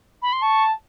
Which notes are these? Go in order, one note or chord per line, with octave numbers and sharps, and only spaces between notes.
B5
C6
A5 C#6